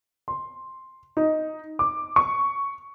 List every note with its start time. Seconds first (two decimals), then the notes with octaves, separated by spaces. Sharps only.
0.28 C6
1.17 D#4
1.79 D6
2.16 C#6